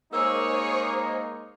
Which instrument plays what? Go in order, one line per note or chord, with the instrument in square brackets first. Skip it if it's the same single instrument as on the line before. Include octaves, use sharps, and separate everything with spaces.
[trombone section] G#3 A#3 D#4 [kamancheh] G#4 C#5 [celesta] A#4 E6 [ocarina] C5